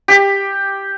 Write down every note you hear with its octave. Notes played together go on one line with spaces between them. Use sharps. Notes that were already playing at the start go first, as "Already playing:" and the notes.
G4